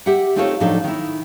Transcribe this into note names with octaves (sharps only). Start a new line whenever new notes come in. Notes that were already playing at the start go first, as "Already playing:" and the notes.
G4 E5 F#5
A3 C4 D#4 F4 A4 C#5
A2 F3 F#3 D4 D#4 A4
D#3 E4